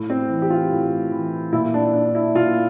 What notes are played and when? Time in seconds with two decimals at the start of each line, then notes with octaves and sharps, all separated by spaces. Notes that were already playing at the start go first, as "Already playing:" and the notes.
Already playing: A2
0.10 C4
0.30 E3
0.42 G4
0.50 F4
0.71 A2
1.12 E3
1.53 A#2 E4
1.74 D4
1.94 D4
2.15 E4
2.35 A#2 F4